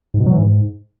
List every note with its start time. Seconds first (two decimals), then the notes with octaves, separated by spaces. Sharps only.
0.14 G#2
0.20 B2
0.26 F#3
0.32 E3
0.38 G#2